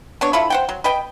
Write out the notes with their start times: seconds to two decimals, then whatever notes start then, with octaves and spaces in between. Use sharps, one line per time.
0.21 B3 D4 C#5
0.33 E4 F4 A4 B5
0.50 C5 F#5 G5
0.69 F#3
0.84 B4 D#5 G5